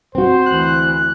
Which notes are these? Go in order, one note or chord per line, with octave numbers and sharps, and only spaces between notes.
C4 F#4 C5
D2 E3 F#6